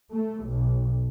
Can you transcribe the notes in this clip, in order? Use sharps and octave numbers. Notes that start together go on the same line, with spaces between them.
A3
B1